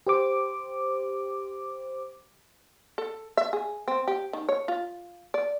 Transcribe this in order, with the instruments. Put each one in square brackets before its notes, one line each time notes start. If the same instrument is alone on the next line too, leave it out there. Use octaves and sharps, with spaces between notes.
[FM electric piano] G4 C5 D6
[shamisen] A4
E5
G#4
C4
G4
D#3
C#5
F4
D5